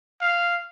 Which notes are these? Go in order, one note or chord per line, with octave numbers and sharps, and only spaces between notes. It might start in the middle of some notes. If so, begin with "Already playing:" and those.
F5